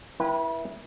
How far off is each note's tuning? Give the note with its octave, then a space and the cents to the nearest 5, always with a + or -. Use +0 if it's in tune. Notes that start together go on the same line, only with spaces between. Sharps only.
E4 +0 B4 -30 G5 +0